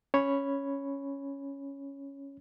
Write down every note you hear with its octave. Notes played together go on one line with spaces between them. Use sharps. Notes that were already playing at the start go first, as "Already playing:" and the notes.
C#4 C#5 B5